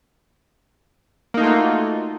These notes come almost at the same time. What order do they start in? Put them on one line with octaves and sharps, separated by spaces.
A#3 D#4 A3 F4 F#4